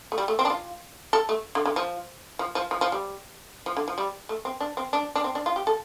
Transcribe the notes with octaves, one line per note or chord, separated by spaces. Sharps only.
A3
G3
A3
C4
D4
F4
A4
A3
D3
D3
F3
F3
F3
F3
F3
G3
F3
D3
F3
G3
A3
C4
D4
C4
D4
D4
C4
D4
F4
G4
A4